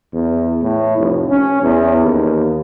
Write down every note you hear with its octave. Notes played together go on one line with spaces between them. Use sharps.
E2
A2
F1
C#4
E2
D#2